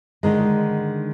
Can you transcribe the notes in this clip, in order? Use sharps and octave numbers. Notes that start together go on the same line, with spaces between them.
D3 D#3 G#3